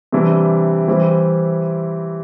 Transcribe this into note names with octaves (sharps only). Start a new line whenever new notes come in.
C3 E3 G3 D4
E3 G3 C4 E4